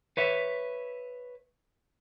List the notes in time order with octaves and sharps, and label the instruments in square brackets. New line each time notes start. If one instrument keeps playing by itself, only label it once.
[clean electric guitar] B4 C#5 E5